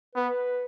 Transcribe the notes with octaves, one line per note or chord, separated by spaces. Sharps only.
B3 B4